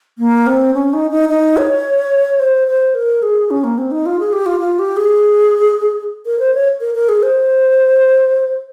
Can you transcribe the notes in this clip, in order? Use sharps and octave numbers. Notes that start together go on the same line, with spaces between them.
A#3
C4
C#4
D#4
D#4
D#4
C#5
C5
C5
A#4
G#4
C#4
A#3
C4
D#4
F4
G#4
G4
F4
F4
G4
G#4
A#4
C5
C#5
A#4
A#4
G#4
C5